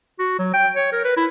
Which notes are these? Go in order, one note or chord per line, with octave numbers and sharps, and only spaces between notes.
F#4
F#3
G5
C#5
A#4
B4
E4